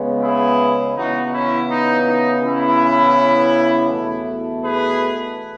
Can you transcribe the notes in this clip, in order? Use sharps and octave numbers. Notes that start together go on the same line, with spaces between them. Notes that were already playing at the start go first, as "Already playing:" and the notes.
Already playing: C#3 G#3 B3
E4 G#4
C#3 E3 B3 D#4 F#4
C#4 E4
D#4
D#4
C#3 E3 B3 C#4 E4
E2 B2 A3
G#4 B4